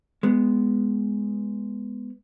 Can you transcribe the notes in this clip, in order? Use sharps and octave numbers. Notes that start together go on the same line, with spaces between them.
G#3 B3